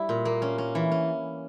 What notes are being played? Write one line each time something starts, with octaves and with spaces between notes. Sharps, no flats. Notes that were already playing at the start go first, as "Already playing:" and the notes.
Already playing: G3 E4
A#2
A#3
C#4
C#4
E3
C#4